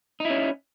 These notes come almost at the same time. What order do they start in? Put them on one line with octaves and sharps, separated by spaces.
D#4 E4 C#4